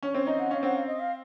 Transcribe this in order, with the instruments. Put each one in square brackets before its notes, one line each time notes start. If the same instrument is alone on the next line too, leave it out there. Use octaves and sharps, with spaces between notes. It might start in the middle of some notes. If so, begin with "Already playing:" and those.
[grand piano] C#4
[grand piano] C4 [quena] C#5
[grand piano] D#4 [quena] D#5
[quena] F#5
[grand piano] C#4 [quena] F5
[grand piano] C4 [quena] F#5
[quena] F5
D#5
F5